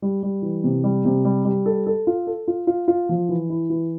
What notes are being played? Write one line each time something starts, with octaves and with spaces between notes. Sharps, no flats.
G3
G3
E3
C3
G3
C3
G3
G3
A4
A4
F4
A4
F4
F4
F4
F3
E3
E4
E3